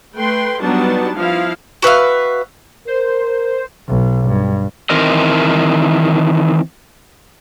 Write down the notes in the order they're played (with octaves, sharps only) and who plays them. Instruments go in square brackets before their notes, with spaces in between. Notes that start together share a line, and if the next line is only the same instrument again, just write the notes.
[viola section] A3 B4 G5 C6
F#3 G3 B3 D4 D#4 A5
F3 E4 F5
[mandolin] F#4 B4 E5 F5
[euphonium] A#4 [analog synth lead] C5
[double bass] B1 B2
G2
[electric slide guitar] D#3 E3 C4 A#4 D#5